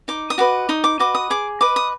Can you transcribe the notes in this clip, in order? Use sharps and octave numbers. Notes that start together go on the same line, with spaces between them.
D#4 D6
D#6
F#4 B4 D#5 D6
D#4 D#6
D6
F#4 B4 D#5 D6
D#6
G#4 D6
B4 D#5 D6
D#6